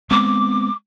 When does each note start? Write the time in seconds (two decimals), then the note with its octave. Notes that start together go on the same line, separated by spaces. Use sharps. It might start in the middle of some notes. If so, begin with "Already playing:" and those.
0.11 G#3 B3 C4 D6